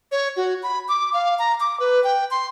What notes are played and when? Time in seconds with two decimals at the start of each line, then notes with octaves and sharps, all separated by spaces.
0.12 C#5
0.37 F#4
0.63 B5
0.89 D6
1.14 F5
1.39 A#5
1.60 D6
1.80 B4
2.04 G5
2.31 C6